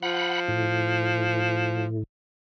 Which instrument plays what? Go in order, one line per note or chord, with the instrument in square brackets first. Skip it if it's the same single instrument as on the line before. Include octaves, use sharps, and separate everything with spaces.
[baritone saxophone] F3 [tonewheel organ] F#5 B5
[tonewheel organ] A2